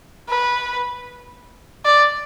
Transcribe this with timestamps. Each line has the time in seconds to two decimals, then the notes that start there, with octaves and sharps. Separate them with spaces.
0.29 B4
1.85 D5